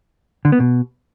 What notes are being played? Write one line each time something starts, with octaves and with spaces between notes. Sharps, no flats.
D3
B3
B2